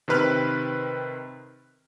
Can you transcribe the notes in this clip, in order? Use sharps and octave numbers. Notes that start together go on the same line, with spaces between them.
C3 D#3 C4 B4 B5 F6